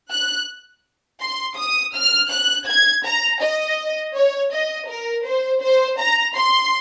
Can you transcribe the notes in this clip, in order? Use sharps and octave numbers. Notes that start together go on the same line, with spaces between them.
F#6
C6
D#6
F6
F#6
G#6
A#5
D#5
C#5
D#5
A#4
C5
C5
A#5
C6